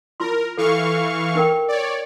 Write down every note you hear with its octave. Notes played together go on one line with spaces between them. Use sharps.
E4 F4 A#4 C6
E3 A4 F5 C#6
D#4 A#4 G5
C#5 D5